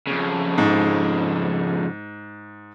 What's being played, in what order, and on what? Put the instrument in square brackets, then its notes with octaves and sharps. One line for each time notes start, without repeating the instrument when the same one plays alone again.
[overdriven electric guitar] F2 C#3
[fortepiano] G#2